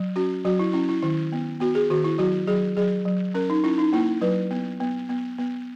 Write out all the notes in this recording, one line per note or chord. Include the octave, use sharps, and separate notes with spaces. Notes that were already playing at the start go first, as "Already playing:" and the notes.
Already playing: F#3
C#4 F#4
F#3 F#4
E4
C#4 E4
E4
D#3 E4
B3
B3 F#4
G#4
D#3 F#4
E4
F#3 F#4
F#3 G#4
F#3 G#4
F#3
C#4 A#4
D#4
C#4 E4
D#4
A#3 E4
F#3 B4
B3
B3
B3
B3